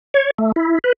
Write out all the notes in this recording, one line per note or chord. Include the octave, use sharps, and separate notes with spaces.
C#5
A3
E4
B4